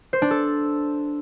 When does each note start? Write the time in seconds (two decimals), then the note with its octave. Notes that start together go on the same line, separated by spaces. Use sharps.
0.13 C5
0.22 D4
0.31 A4